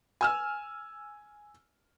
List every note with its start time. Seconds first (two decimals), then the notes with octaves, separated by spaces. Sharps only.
0.21 G#5 E6 F6